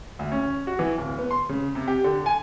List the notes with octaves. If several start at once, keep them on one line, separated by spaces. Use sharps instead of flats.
D2
C#4
F#4
E3
D1
B3
C6
C#3
C3
G4
D3
G#5